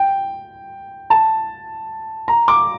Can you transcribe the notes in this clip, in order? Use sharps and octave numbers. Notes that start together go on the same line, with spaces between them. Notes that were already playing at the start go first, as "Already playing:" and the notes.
Already playing: G5
A5
A#5
D6